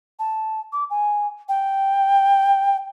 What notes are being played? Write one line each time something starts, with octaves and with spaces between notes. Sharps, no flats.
A5
D6
G#5
G5